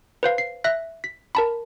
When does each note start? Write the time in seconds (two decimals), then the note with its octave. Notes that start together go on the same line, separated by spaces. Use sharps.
0.23 B4 C5 F5
0.38 C7
0.64 E5 F#6 A#6
1.04 B6
1.35 A#4 A5 B5